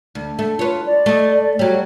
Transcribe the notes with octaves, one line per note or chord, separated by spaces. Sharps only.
D2
A3
F4 B4 C#5
D5
A3 D#5
F#3 G3 C#5